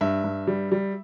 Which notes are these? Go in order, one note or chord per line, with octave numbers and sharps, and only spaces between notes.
G2 E5
G2
G3
G3